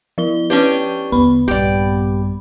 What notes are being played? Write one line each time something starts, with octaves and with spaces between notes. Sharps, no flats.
F3 E4 G7
C#4 D4 G4 B4 G7
E2 D3 B3 B5
A#1 G2 G4 D5